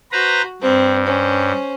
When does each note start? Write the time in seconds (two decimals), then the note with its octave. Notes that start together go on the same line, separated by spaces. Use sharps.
0.12 F#4 B4 C5 A#5
0.62 G2 C4
1.05 C#4 C5